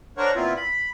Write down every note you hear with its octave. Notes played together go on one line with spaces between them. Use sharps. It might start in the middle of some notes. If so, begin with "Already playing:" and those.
D4 A#4 C5 C#5 F#5 C#6
A#2 B3 C4 E4 F4
B5